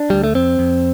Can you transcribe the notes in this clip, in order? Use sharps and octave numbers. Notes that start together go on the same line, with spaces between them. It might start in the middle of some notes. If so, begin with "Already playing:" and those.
Already playing: D4
D2 G3
A3
F2 C4
F2